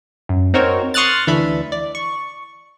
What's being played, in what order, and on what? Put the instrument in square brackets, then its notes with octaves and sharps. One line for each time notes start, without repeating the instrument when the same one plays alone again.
[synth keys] F#2
C4 D#4 F#4 A#4 C5 C#5
C6 C#6 D#6 F6 F#6 A6
D2 E3 D4 E5 B5
D5
C#6